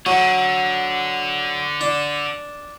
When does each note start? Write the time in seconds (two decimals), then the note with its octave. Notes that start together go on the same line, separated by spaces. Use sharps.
0.06 D3 F#3
1.81 D4